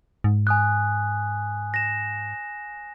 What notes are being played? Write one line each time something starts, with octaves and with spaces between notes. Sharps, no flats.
G#2
G#5 D#6 F#6
A#6 E7